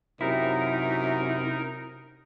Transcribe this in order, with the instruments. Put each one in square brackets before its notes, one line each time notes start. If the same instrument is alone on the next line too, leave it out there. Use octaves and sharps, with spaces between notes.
[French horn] F#2 [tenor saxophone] C3 [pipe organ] D#4 A#4 [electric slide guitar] E4